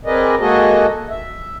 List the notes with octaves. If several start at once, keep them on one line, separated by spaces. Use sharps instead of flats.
C4 G#4 A#4 B4 D5 D#5
G#3 A#3 F#4 G#4 A4 D#5
E5